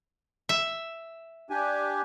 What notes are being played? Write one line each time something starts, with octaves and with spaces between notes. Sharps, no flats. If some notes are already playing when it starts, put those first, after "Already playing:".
E5
D4 G4 G#5